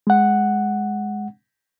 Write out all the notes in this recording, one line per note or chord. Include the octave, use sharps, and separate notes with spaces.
G#3 F#5